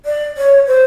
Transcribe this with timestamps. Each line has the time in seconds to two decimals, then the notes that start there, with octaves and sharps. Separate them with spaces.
0.05 D5
0.37 C#5
0.67 C5